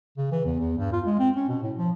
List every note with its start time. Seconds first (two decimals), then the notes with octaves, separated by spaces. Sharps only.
0.17 C#3
0.31 E3
0.45 E2
0.59 E2
0.78 G2
0.92 F4
1.06 G#3
1.19 C4
1.36 C#4
1.49 B2
1.62 A2
1.77 F3